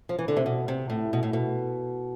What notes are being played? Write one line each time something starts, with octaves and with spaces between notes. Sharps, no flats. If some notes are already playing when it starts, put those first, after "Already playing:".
F3
E3
D3
C3
B2
C3
A2
B2
A2
B2